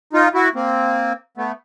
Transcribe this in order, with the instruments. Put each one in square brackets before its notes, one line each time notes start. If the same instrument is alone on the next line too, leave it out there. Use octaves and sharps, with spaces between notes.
[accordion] D#4 F4
E4 F#4
A#3 C4
A3 B3